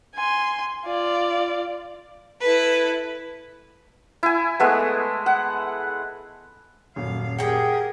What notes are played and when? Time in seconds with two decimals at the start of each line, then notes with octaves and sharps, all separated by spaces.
0.15 G#5 C6
0.85 F4 D5
2.40 E4 A4 B4
4.23 E4 G#5
4.60 G#3 A3 B3
5.26 F#5
6.96 D#1 F#2 F5
7.39 G4 G#4 A#4 F#5 G5